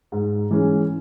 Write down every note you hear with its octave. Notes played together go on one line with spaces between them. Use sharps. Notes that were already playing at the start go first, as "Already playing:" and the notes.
G#2
E3 G#3 C#4